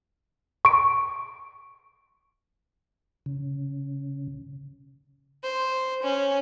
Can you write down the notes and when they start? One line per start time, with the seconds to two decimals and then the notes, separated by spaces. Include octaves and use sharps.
0.65 C#6 D7
3.26 C#3
5.43 C5
6.04 C#4